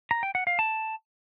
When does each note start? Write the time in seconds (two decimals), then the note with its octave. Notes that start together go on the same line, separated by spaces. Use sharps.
0.11 A#5
0.23 G5
0.35 F#5
0.47 F5
0.59 A5